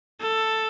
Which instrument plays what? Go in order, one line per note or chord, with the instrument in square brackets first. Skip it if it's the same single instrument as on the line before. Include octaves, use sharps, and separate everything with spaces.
[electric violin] A4